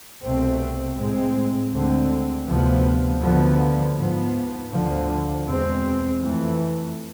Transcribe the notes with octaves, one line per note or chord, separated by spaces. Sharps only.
C2 B2 A3 C4
A2 G#3 C4
D2 D3 G#3 C4
D2 C3 F3 B3
D2 D3 F3 B3
G#2 F3 B3
D2 D3 F3
E2 B2 G#3 C4
F2 E3 A3